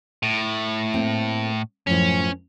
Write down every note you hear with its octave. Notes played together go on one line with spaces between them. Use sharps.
A2
A3 A#3 C4
F#2 A2 F3 C#4